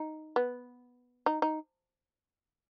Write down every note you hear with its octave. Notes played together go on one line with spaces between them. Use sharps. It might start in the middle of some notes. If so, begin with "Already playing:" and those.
Already playing: D#4
B3
D#4
D#4